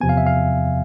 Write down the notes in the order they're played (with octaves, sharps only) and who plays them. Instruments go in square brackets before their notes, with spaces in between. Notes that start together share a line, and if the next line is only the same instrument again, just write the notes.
[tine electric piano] E2 C3 F3 B3 G#5
F5
E5
F5